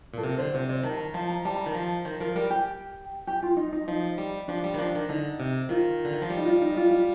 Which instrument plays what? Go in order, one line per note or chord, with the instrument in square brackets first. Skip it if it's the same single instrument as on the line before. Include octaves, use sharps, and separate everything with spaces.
[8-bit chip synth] A#2 [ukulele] A4
[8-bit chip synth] C3 [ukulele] A#4
[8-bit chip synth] D3 [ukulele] C5
[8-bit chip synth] C3 [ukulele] C5
[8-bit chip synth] C3 [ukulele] D5
[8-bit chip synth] D#3 [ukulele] A5
[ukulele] A#5
[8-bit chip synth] F3 [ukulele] A5
[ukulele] A#5
[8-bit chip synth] G3 [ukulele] A5
[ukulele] A#5
[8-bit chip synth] D#3 [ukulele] A5
[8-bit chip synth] F3
[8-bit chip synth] D#3 [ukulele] C5
[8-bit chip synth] F3 [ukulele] A#4
[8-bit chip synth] G3 [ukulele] A#4
[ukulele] G4
G4
F4
D#4
D#4
[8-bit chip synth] F3 [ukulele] D#4
[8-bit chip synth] G3
[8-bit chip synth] F3 [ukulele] D4
[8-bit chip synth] G3
D#3
[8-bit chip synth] F3 [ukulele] D4
[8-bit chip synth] D#3
[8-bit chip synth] D3 [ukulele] D#4
[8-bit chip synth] C3
[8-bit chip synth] D#3 [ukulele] F4
[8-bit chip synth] D3
D#3
F3
G3
[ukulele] D#4
F4
D#4
F4
F4